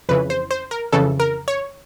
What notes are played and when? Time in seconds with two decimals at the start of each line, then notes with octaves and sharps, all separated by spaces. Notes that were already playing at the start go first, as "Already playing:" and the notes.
0.09 F2 C#3 E3 B4
0.30 C5
0.51 C5
0.71 A#4
0.92 F2 C#3 E3 A4
1.20 A#4
1.48 C#5